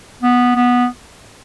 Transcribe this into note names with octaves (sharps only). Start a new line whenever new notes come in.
B3
B3